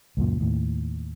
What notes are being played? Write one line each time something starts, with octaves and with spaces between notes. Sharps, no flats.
C#2 F#2 A#2
D#2 A2